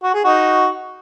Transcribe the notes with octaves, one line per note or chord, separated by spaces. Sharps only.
F#4
G#4
D#4 F#4